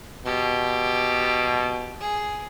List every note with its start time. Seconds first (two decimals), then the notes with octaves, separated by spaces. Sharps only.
0.26 B2 G4
2.00 G#4